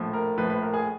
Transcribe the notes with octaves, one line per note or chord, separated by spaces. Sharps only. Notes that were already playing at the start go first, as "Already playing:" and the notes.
Already playing: A#1 A2 F3
A#4
A#1 A2 F3 B4
B4
A#4
G#4